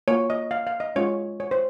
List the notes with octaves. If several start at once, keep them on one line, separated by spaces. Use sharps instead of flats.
A#3 F4 C#5
D#5
F5
F5
D#5
G#3 C#4 F4 C#5
C#5
C5